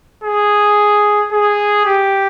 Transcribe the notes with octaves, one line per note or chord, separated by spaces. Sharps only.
G#4
G#4
G4